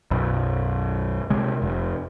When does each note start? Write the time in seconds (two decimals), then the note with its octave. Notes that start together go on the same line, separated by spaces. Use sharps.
0.11 B1 F#2
1.30 C3 G#3
1.62 F1